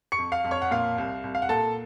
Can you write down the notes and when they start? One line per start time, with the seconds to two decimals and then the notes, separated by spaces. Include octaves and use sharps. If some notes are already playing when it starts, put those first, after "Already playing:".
0.12 C#6 C#7
0.18 F2
0.32 F5 F6
0.44 F2
0.51 C#5 C#6
0.62 F#5
0.71 A#2 F5
0.98 C2
1.24 C2
1.35 F5
1.42 F#5
1.49 A#2 A4 A5